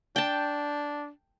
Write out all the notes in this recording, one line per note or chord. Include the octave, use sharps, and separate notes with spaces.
D4 G5 A5